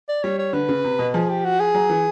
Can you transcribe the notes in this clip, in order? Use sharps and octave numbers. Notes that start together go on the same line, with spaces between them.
D5
G3 C#5
C#5
D3 B4
C#3
C3
B2
F3 G#4
G4
F#4
G#4
F#3
E3